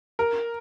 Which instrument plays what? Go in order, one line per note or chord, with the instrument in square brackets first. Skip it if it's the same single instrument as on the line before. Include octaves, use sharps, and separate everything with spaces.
[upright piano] A#4